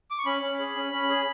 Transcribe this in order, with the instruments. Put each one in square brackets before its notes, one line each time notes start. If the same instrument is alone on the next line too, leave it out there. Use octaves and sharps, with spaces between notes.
[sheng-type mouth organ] D6
C#6
C#4 B5
C#4
G#4
C#4
C#4
G#4